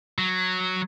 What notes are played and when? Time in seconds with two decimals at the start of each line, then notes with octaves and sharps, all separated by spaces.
0.18 F#3